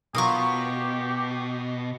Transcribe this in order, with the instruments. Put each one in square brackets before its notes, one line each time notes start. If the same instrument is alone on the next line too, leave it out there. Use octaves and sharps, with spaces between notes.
[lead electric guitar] B2 [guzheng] F#3 F4 A#4 [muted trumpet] G4 [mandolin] C#6 D#6